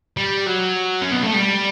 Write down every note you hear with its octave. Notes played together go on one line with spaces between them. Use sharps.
G3
F#3
C#4
B3
A3
G3